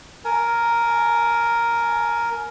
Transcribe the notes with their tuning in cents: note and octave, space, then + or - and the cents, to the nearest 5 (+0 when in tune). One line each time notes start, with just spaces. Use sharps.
A#4 +0 G#5 +25